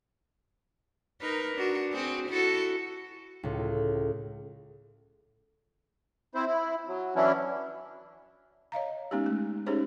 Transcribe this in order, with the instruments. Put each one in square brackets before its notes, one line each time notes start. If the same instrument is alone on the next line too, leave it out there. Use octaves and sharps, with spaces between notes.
[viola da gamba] D#4 A#4 B4
D4 F#4
C4 F#4 G#4
E4 F#4 A4
[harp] C#2 A2
[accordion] C4 E4 C5
E4
F#3
E3 F#3 C#4 D4 E4
[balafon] C#5 D#5 F5 A#5
G#3 B3 C#4 D#4 G4
A3
C#4 D#4 G4 G#4 C5 C#5